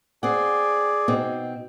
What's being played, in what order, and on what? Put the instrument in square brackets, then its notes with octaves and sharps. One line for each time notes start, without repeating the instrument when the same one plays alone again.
[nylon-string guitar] C4 F#5 [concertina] G#4 D5
[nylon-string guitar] B2 C4 D#4